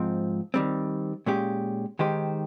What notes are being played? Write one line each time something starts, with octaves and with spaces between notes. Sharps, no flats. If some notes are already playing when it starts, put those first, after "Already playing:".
Already playing: G#2 F3 C4
D#3 G3 C4
A#2 G#3 C#4 G4
D#3 G#3 D#4 G4 C5